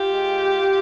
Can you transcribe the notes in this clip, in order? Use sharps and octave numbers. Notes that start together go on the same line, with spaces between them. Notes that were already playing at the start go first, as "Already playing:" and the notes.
Already playing: F4 G4
G#3